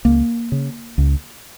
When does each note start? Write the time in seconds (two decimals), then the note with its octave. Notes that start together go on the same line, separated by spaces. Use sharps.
0.05 C#2 A#3
0.52 C#3
0.98 C#2